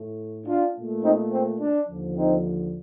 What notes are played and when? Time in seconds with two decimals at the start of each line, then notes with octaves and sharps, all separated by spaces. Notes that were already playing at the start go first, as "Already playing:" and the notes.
Already playing: A2 A3
0.47 D4 F4
0.75 A#2 A3
1.03 C4 D#4
1.32 C4
1.60 D4
1.88 D#2 D3 F3
2.17 C4 D#4